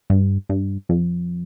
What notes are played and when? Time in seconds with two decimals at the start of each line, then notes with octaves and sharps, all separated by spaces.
0.10 G2
0.49 G2
0.89 F2